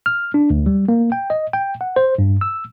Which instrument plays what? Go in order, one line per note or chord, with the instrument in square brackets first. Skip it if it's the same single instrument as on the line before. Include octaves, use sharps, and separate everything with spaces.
[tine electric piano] F6
D4
D2
G3
A#3
G5
D#5
G5
F#5
C5
G2
E6